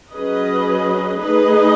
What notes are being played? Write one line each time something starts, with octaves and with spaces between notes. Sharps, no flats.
F#3 C#4 G#4 B4 D#5
A3 D#4 G#4 B4 D#5